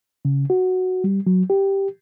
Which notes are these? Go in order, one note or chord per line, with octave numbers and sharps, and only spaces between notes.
C#3
F#4
G3
F#3
G4